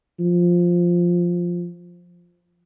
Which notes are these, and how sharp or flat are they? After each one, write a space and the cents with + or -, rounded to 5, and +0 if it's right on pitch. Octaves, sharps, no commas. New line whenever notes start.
F3 +5